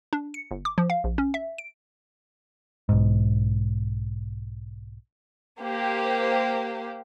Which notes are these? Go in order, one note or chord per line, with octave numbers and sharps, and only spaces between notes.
D4
C#7
G1
D6
F3
F5
A#1
C#4
E5
D7
B1 G#2
A#3 G4 C5